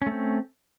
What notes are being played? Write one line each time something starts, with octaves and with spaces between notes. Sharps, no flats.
A3 C4 C#4